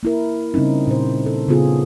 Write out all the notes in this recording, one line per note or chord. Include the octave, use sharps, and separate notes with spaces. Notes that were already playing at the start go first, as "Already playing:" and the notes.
A#3 E4 A#4
C#3 G3 C4 C#4 D#4
A#2 C5
A4
C#3 B3 C#4 F4 G#4